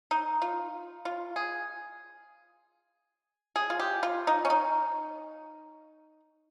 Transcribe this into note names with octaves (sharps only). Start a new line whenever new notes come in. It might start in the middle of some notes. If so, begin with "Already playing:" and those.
D#4
F4
F4
G#4
G#4
F4
G4
F4
D#4
C#4
D#4